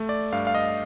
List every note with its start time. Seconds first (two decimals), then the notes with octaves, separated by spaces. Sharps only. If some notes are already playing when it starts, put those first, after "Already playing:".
Already playing: A3
0.09 D5
0.32 G2 F5
0.47 F5
0.55 D#5